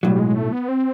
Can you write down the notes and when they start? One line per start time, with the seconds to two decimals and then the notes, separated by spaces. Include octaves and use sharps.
0.03 B1 A2 F#3 G3
0.15 G3
0.19 G#3
0.36 A3
0.52 B3
0.68 C4